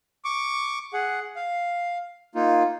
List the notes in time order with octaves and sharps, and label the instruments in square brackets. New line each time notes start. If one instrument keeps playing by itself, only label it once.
[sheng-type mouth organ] C#6 D6
G#4 F#5
F5
A#3 D#4 F4